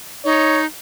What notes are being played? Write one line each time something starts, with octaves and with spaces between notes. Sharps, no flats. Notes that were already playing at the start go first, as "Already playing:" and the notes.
D#4 C#5